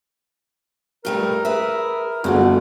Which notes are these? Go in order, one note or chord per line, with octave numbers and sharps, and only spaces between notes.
G2 G3 A3 A#4
G#4 B4 E5
G1 F2 D3 A3 F#4 G#4